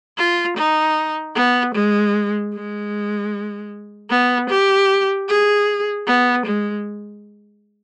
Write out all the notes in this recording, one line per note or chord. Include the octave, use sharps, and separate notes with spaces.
F4
D#4
B3
G#3
G#3
B3
G4
G#4
B3
G#3